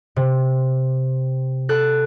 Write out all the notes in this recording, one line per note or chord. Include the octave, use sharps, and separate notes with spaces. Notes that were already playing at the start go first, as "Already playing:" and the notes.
C3
A4 F#6